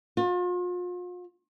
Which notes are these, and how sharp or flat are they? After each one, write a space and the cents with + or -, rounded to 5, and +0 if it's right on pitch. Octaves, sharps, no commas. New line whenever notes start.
F4 +40